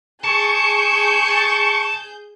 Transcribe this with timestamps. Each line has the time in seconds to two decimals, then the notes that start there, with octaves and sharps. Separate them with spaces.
0.24 G#4 A5 C#6 G6